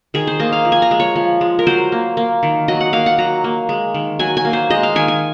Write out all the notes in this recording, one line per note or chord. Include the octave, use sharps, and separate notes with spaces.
D#3 G#4
C5
A#3 D#5
F5
F3
G#5
A#5
G#3
C#5
F3
G#3
A#4
F#3 C5
A#3
A#3
D#3
F#3 D#5
F#5
A#3 F5
F#5
F#3 A#5
A#3
G#3
D#3
F#3 G#5
G#5
A#3
C5
G#3 D#5
F5
D#3 G#5
G#5